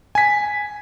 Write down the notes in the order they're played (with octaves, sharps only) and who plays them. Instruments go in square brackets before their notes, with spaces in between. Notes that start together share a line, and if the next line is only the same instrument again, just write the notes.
[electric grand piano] G#5 B6